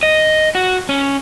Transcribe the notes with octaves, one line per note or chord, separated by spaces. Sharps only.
D#5
F#4
C#4